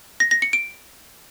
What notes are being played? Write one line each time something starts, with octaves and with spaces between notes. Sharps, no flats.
A#6
A#6
C#7
D7